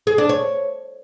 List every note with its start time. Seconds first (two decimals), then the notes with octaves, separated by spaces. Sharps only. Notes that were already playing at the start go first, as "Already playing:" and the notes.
0.07 G#4
0.18 D4
0.29 C#5